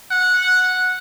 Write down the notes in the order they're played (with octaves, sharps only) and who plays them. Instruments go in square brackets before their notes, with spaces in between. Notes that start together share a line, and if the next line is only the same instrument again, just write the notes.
[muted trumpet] F#5